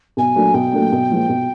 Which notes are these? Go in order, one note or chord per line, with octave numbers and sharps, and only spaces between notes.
B1 G#5
A#2 F#3 A3 D4
B1 G5
A#2 F#3 A3 D4
B1
A#2 F3 G#3
B1